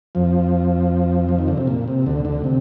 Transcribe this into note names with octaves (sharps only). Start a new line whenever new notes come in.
F2 F3
F3
D#3
D3
C3
A#2
C3
D2 D3
D2 D3
C3